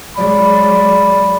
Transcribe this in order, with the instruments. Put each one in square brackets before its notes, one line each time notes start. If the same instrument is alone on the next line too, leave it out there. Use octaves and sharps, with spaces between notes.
[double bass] F#3 G#3 [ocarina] D5 [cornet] B5